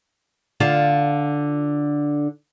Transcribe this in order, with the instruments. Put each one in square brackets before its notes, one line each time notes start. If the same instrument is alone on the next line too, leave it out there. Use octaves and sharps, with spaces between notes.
[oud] D3 F4 F5